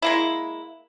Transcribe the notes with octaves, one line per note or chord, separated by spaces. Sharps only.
G#3 A#3 E4